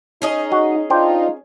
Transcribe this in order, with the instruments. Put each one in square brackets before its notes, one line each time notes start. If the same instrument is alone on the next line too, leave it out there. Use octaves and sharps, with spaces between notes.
[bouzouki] C#4 G#4 D#5 [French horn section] D#4
[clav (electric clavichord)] F#4
[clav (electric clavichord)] D4 C5 G5 [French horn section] D#4 F4